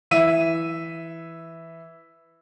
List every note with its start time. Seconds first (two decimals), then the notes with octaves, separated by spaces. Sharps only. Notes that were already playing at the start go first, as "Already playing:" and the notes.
0.11 E3 E5 D#7